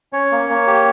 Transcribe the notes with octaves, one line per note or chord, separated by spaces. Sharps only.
C#4 C#5
A#3
A#3
G4